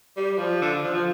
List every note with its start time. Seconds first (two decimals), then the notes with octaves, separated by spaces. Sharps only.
0.17 G3
0.38 F3
0.62 D3
0.84 F3
0.94 F3